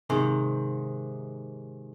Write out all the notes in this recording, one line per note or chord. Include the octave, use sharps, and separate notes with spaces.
G#2 C3 D#3